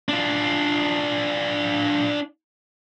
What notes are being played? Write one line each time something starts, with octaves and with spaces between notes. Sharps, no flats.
D4 F4